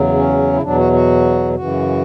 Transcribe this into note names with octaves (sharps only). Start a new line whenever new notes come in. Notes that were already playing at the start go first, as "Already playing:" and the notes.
Already playing: E2 C#3 F#3
C#4
E4
E2 B2 F#3 D4
F#4
F#4
F#2 C#3 E3 F#4